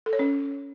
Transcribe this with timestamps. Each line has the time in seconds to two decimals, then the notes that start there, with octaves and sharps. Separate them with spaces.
0.06 A4
0.13 C#5
0.19 C#4